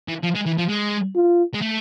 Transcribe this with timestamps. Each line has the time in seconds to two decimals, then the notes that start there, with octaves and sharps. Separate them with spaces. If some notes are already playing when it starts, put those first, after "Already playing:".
0.08 E3
0.23 F3
0.35 G#3
0.46 E3
0.58 F3
0.68 G#3
1.15 F4
1.54 G#3
1.61 A3